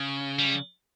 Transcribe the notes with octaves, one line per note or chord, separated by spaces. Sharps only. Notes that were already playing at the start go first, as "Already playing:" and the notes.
Already playing: C#3
G3